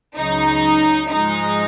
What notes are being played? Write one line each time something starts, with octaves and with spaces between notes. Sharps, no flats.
C#2 C#3 F#3 D#4
G#2 F3 G#3 D#4